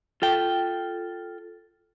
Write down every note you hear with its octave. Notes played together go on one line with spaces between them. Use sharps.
F4 A4 G5